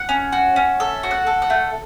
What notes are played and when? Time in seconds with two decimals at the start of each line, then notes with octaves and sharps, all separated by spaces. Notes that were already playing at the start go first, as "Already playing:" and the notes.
Already playing: F#5
0.09 C#4
0.32 F#4
0.56 C#4
0.80 A4 E5
1.03 F#4
1.11 F#5
1.27 A4
1.42 F#5
1.50 A3